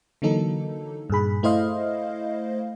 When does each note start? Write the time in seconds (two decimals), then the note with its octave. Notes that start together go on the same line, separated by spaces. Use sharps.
0.22 D3 E3 F#3 A#3 D#4 A4
1.10 G2 A#2 G#4 B5
1.43 A3 E4 C5 D#5 F5